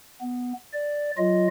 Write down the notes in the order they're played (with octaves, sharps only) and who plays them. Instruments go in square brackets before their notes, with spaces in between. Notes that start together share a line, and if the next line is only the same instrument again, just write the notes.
[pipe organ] B3
D5
F#3 F4 D#5